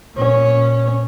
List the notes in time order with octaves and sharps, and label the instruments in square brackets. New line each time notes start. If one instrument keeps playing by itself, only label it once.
[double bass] A#2 C#4